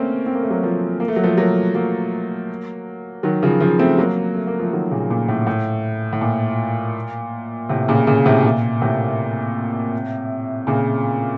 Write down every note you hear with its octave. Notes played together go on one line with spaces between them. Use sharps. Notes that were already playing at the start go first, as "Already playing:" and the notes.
Already playing: A3 A#3 C4 C#4
C4
A#3
A3
F#3 A#3
F3 A3
A#3
A3
F#3
F3 A3
F#3 A#3
F#3 A#3
D#3 F#3
C#3 F3
C#3 F3
A3 C4
F#3 A#3
A3
A#3
F3 A3
D#3 F#3
A#2 C#3
A#2
A2
A2
A2
A#2
A2 C3
A#2 C#3
A#2 C#3
A2 C3
A#2
A2 C3
A#2 C#3